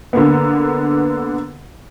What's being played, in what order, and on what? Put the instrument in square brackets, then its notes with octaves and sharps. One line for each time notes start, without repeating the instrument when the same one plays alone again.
[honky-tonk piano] D3 A#3 B3